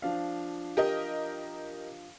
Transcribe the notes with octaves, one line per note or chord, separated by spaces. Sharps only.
F3 D4 F5
G4 A#4 D#5